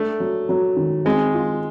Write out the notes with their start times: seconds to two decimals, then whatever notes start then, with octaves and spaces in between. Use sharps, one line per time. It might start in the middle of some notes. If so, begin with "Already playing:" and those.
Already playing: A3 D4
0.20 F#3
0.49 F#3
0.76 D#3
1.05 G#3 C4
1.34 F4